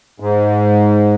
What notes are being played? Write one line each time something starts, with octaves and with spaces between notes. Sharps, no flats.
G#2